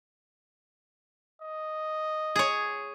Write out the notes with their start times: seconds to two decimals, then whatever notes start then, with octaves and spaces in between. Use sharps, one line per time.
1.42 D#5
2.36 G#4 C#5